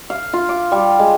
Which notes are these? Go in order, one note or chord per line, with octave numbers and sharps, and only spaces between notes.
F5
F4
D6
G3
G#3